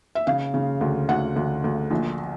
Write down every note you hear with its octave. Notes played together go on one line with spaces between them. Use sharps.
E5
C#3 F5
C#3
D2
D2 F#5
D2
D2
A#1